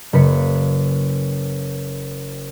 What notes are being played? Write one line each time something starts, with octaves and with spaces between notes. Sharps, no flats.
F#1 B4 B6 C#7